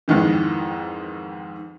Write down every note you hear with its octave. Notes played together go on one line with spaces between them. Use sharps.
F2 G#2 D#3 E3